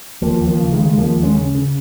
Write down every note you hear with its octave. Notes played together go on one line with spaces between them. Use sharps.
D#2 F3 A#3
D#2
F3 A#3
C#3
D#3 G#3
C#3
G#3
D#2 F3 A#3
D#2
G#3 C#4
C#3
C#3